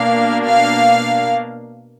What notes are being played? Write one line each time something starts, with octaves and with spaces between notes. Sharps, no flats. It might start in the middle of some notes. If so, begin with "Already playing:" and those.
Already playing: B2 A#3 D4 F5
F5